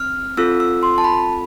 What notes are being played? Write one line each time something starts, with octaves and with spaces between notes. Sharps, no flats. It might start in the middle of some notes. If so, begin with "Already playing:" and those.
Already playing: C4 F6
C4 F4 A4 E6
E6
C6
A5
B5